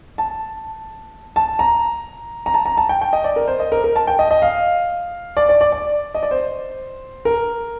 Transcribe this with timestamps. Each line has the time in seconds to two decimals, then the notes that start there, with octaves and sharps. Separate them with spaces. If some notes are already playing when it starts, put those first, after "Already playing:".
0.18 A5
1.36 A5
1.59 A#5
2.46 A#5
2.54 A5
2.66 A#5
2.77 A5
2.89 G5
3.01 G5
3.13 D#5
3.24 D5
3.36 A#4
3.48 C5
3.60 D#5
3.72 A#4
3.84 A#4
3.96 A5
4.07 G5
4.19 D#5
4.31 D#5
4.42 F5
5.37 D5
5.49 D5
5.61 D5
5.72 D5
6.14 D#5
6.23 D5
6.31 C5
7.25 A#4